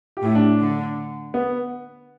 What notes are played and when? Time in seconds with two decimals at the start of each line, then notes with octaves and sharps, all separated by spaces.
0.17 G4
0.22 A2 E4
0.35 D4
0.60 D3
1.34 B3